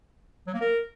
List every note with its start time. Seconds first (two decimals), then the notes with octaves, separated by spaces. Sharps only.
0.47 F#3
0.54 A#3
0.61 A#4